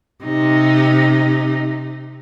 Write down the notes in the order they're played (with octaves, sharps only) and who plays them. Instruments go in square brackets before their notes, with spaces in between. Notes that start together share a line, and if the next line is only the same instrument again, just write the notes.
[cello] C3 D#4